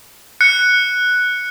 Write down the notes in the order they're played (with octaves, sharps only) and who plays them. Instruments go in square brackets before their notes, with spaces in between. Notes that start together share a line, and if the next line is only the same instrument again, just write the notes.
[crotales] F#6 C#7